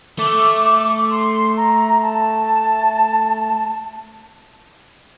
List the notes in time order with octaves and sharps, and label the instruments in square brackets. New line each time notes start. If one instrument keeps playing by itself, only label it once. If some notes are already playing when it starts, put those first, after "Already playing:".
[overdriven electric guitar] A3 [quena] D6
[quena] C6
A#5
A5